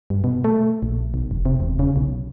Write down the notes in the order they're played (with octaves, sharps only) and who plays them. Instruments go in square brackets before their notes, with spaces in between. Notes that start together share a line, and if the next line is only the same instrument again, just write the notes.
[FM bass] G2
B2
A3
A#1
B1
F1
C3
E1
C#3
B1